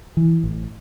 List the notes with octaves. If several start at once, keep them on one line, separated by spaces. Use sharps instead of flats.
E3
A1